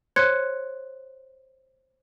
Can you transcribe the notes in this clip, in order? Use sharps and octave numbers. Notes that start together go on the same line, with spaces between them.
C5 C#5 C6 F#6 G#6 C#7